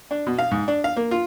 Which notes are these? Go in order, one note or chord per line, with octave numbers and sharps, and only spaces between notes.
D4
B2
F5
G#2
D4
F5
A#3
F4